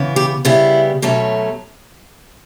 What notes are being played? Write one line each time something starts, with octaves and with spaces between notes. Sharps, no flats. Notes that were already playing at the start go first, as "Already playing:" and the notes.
Already playing: C#3 E3 B3
G4
C#3 G3 B3 E4
B2 F#3 A3 C#4